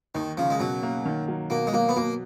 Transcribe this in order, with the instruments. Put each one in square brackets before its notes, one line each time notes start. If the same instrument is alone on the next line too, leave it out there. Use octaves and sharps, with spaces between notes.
[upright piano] D#2 [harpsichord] D#3
[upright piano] C#3 [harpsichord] F3
[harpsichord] G#3
[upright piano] B2 [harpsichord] F#3
[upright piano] A#3
D#3
F#3
[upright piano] B2 [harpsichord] A#3
[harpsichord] G#3
[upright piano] F#3 [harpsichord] A#3
[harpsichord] B3
[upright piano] B2 [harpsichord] A#3